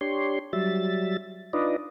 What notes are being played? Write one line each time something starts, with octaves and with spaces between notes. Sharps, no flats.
D4 G4 C#5 C6
F#3 G3 E5 A6
D4 D#4 F4 B4 D5 D#5